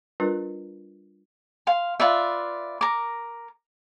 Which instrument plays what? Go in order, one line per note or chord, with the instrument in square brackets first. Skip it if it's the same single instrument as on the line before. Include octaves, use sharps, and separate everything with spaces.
[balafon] G3 D4 F4 A#4 B4
[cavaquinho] F5 C6
F4 B4 D5 E5
A#4 D6